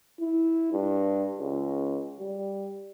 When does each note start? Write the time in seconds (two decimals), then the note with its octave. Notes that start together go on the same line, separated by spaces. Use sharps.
0.20 E4
0.73 G2
1.38 C#2
2.20 G3